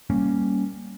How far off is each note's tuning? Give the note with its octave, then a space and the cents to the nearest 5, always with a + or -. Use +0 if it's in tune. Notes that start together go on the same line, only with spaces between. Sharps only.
G3 +0 A#3 +0 C#4 +0